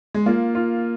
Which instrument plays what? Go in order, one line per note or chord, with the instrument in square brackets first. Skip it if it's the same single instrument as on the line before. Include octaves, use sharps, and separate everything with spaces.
[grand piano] G#3
[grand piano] A#3 [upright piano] F4
[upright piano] F4